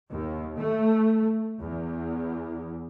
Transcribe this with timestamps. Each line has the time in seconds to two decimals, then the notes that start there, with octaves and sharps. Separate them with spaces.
0.11 D#2
0.59 A3
1.60 E2